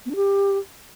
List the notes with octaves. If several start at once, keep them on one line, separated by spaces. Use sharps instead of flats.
B3
D4
G4